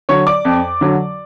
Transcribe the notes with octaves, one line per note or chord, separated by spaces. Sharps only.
D3 F#3 C#5 C#6
D5 D6
F2
D3 F#3